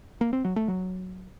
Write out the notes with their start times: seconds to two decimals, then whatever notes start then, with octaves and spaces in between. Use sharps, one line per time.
0.21 A#3
0.33 C4
0.45 F#3
0.56 A3
0.68 F#3